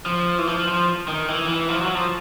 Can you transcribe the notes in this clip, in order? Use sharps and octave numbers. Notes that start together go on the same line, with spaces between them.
F3
E3
F3
F3
D#3
E3
E3
F3
F#3
F3